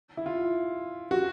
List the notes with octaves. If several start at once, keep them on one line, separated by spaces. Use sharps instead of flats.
E4
F4
F#4